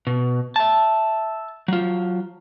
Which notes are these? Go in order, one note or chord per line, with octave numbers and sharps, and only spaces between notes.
B2
E5 A5
F#3 F4